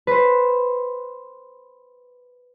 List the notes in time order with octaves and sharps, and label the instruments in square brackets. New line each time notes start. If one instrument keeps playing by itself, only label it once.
[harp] B4 C5